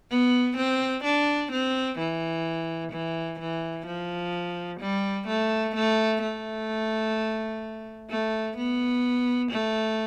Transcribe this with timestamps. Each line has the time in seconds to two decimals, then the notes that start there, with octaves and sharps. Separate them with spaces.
0.10 B3
0.57 C4
1.04 D4
1.52 C4
1.99 E3
2.92 E3
3.40 E3
3.86 F3
4.80 G3
5.27 A3
5.75 A3
6.22 A3
8.10 A3
8.57 B3
9.51 A3